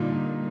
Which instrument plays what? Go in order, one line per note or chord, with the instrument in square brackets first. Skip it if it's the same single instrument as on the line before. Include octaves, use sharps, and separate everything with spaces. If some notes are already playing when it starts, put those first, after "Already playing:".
Already playing: [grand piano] A#2 [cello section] D3 G3 A#3 D#4
[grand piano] A#2